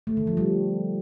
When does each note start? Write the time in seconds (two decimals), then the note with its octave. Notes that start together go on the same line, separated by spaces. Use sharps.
0.07 A3
0.17 D3
0.27 F3
0.37 G3